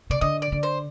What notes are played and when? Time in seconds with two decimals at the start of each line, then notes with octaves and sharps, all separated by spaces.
0.10 C3 D5
0.21 D3 D#5
0.42 D5
0.52 D3
0.63 C5